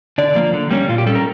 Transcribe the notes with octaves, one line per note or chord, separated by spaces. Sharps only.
D3 D5
F3 A#3
D3
G3 A#3 C#4
A#2 F4
G4
G3 C#4 A4
A#4